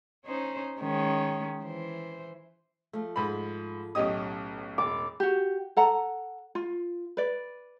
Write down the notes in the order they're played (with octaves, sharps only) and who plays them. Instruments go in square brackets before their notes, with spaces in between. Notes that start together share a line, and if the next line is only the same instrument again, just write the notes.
[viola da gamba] C#4 D#4 C5
D#3 G#3 C#4
E3 C5
[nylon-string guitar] F3 A3
[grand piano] G#2 B5
[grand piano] B1 G4 D#6 [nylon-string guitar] A2 C#4 D#5
[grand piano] E1 [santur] D6
[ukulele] F#4 G4
A4 F#5 A#5
F4
B4 D5